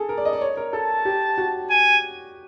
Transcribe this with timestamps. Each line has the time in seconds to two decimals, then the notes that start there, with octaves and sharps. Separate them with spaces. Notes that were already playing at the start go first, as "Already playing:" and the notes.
Already playing: G#4 A4
0.09 A#4
0.18 D5
0.25 D#5
0.33 D5
0.41 C#5
0.57 A#4
0.73 A4 A5
1.05 G4
1.38 F#4
1.70 G#5